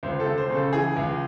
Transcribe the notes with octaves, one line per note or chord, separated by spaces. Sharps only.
C#2 C5
A4
C#2
C5
C#3
A4
E3 G#4
C#2